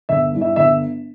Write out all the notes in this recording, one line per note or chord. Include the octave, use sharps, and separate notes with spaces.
G1 E5
G2 E3
E5
G1 E5